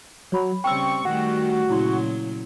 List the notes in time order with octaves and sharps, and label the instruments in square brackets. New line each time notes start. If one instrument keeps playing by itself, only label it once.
[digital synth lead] F#3 [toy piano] C#5 B5
[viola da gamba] C#3 G3 C4 [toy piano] G5 E6 [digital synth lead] C#6
[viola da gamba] D#3 G3 A3 [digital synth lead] F#4 [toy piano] F#5
[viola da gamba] A#2 C#3 F#3 [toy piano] E4 C6